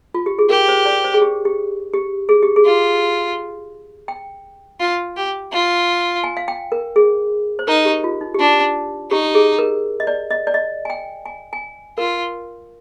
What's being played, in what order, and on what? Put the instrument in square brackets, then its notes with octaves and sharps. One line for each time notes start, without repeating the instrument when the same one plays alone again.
[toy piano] F4
G4
G#4
[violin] G4 [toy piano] A#4
[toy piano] C5
D5
C5
G#4
G4
G4
G4
G#4
G4
G#4
[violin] F4
[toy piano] G5
[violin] F4
G4
F4
[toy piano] G#5
F5
G5
A#4
G#4
C5
[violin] D#4 [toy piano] A#4
[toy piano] G4
F4
D#4
G4
[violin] D4 [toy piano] F4
[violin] D#4 [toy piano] G4
[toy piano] G#4
A#4
D#5
D5
D#5
D5
D#5
G#5
G5
G#5
G#5
[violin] F4 [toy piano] A#4